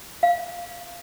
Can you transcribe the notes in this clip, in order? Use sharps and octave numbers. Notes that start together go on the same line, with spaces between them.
F5